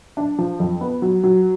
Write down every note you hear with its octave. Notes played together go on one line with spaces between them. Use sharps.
D4
F3
F2
B3
F#3
F#3